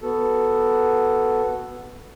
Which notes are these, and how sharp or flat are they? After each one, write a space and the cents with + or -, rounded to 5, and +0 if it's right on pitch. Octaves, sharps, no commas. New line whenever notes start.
B3 +0 F#4 +0 A4 +0